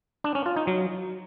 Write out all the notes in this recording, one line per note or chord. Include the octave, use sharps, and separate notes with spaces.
D4
C#4
F4
D#4
F#3